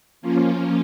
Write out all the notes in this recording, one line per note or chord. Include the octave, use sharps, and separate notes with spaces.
F3 A#3 C#4 F4